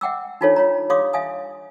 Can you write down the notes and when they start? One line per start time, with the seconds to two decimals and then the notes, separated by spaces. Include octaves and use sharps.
0.01 E5 F#5 G5 D6 E6
0.41 D4 D#4 F4 A4 C5 C#5
0.56 F4 C#5 A#5
0.90 G4 C#5 F5 C6 D6 D#6
1.13 E5 F5 G#5 D#6